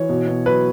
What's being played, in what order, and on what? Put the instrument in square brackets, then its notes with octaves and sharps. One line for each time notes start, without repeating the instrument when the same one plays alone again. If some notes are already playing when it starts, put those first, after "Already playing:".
Already playing: [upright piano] E3 C#5
B2
B2
F#3 B4